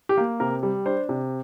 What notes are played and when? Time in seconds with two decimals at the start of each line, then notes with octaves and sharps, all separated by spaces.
0.09 G4
0.17 A#3
0.40 C3 A#4
0.63 G3
0.86 D4 C5
1.09 C3